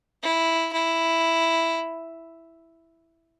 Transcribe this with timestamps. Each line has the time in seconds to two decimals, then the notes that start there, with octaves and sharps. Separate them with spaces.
0.23 E4
0.73 E4